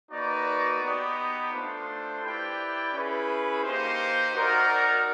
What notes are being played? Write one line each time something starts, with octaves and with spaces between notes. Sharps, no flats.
A#3 D#4 F#4 B4 D5
B3 D#4 G4
A3 D4 F4 A4 C5
E4 G4 B4 D5 G5
C#4 E4 G#4 B4
A#3 D#4 G4 C5
D#4 F#4 A#4 D5